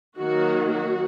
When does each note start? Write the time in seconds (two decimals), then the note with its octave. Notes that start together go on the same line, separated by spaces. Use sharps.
0.17 D#3 F#3 A#3 F#4
0.69 F#4